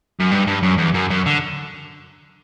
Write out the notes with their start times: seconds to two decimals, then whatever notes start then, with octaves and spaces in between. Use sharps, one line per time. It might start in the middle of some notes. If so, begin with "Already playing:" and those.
0.20 F#2
0.31 G2
0.47 G2
0.63 F#2
0.78 E2
0.94 F#2
1.10 F#2
1.26 D3